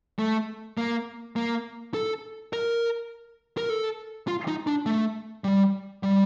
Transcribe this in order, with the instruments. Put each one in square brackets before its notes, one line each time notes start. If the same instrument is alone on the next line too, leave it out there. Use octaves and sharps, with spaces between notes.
[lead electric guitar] A3
A#3
A#3
A4
A#4
A#4
A4
F4
D#4
D4
A3
G3
G3